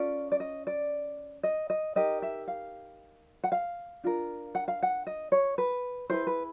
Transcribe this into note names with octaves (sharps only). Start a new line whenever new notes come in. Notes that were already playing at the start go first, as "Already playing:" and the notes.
Already playing: C#4 F4 A4 D5
D5
D#5
D5
D#5
D#5
D#4 G4 A#4 D#5
E5
F5
F#5
F5
D4 F4 A#4
F#5
F5
F#5
D#5
C#5
B4
E4 G#4 B4 C5
B4